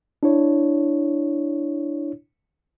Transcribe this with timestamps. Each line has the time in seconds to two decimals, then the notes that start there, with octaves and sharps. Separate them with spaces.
0.23 D4 E4 C#5